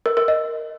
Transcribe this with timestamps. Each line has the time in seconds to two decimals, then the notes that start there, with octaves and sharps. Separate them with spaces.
0.06 A#4
0.17 A#4
0.28 D#5